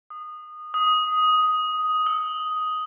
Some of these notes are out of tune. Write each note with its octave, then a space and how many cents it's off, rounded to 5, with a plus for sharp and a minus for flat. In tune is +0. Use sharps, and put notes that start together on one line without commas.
D#6 -20
D#6 +5
E6 -20